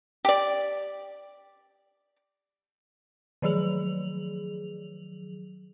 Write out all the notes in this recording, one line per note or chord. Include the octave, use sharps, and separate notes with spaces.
G4 D5
D#3 F3 F#3 G#4 F7 F#7